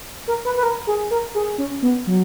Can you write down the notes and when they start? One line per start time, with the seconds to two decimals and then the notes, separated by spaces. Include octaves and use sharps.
0.28 A#4
0.45 B4
0.57 B4
0.63 A#4
0.87 G#4
1.11 A#4
1.35 G#4
1.58 C#4
1.82 B3
2.07 F#3